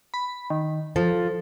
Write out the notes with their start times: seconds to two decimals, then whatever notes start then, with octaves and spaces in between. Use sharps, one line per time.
0.14 B5
0.50 D#3
0.96 F3 A4